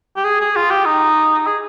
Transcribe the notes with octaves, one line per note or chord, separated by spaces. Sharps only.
G4
G#4
G#4
F4
G4
D#4
G#4